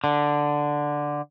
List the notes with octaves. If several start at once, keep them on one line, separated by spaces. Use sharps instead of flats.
D3